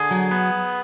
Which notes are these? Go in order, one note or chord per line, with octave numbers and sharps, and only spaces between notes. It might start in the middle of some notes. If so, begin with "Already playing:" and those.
Already playing: D3 G#4
F#3
B3